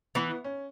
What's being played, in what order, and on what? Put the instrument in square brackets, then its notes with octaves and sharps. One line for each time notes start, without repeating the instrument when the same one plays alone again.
[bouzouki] E3 [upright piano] B3
[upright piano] C#4